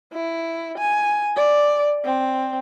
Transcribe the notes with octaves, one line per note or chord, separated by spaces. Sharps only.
E4
G#5
D5
C4